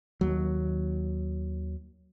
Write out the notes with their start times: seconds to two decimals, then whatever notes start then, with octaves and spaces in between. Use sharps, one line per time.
0.21 D#2 F#3